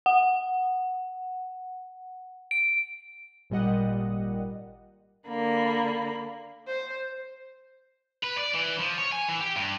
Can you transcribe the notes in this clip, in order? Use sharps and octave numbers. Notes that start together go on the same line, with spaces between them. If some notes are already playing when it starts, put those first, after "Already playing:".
F#5
D7
G#1 A#2 G3 D#5 F#5
D3 A#3 B5
C5
B4
D5
E3
F3
C#5
G#5
E3
G4
G2